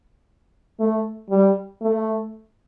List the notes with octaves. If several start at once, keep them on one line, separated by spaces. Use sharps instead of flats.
A3
G3
A3